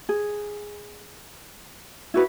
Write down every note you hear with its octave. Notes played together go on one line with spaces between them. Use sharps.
G#4
E4 F#4 B4